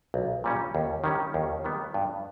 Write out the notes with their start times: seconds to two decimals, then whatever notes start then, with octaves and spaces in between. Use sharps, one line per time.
0.14 B1
0.44 A#2 G3 C#4
0.75 D#2
1.04 D#3 G3 C#4 G4
1.34 D#2
1.64 D#3 G3 B3
1.94 G2